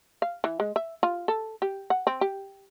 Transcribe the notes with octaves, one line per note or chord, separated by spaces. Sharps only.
F5
E3
G#3
E5
F4
A4
G4
F#5
C4
G4